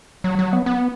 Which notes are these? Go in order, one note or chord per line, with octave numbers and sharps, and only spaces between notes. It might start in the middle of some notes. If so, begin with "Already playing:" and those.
F#3
F#3
B3
B3